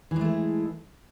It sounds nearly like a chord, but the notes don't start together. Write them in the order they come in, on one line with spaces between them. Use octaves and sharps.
E3 G#3 A3